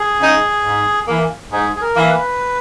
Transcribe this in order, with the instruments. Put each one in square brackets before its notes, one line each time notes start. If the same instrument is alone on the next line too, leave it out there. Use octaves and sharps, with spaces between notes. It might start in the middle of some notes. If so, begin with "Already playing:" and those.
Already playing: [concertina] G#4
[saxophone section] C#3 G#3 D#4
G#2
E3 A#3
[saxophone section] G#2 [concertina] G#4
[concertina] G#4
A#4
[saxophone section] E3 A#3
[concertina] B4